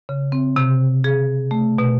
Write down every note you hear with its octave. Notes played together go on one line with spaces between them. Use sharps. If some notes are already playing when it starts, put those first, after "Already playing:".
C#3
C4
C3
G#4
A3
B2